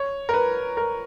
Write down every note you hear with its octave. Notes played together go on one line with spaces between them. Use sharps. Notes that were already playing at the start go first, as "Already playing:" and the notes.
Already playing: C#5
A#4
B4
A#4